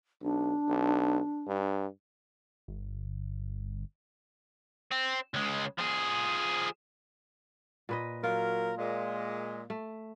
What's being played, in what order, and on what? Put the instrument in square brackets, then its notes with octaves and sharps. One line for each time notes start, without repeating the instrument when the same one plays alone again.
[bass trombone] B1 [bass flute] D4
[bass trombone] B1
G2
[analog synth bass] G1
[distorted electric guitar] C4
C#2 G#3
F3 G#4
[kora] A#2 B4 D#5
[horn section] F#3 A#4 [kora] F4
[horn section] A#2 G#3
[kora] A3